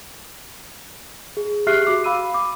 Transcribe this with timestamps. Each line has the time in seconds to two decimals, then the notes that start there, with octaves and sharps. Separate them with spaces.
1.37 G#4
1.67 G4 G#4 E5 F6 F#6 C7
1.85 F#4 D6 C7
2.04 F5 B5 E6 D#7
2.34 D6